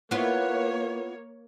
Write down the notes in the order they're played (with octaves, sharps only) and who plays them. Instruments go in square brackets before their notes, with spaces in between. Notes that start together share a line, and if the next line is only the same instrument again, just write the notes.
[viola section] A#3 C#5 [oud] B3 E4 F4